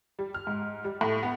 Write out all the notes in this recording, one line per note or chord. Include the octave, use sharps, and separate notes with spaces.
G3
F6
G#2
G3
A2
B3